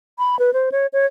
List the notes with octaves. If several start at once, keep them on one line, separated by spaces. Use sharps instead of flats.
B5
B4
C5
C#5
C#5